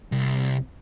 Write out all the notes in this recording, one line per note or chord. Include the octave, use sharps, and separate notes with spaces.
C2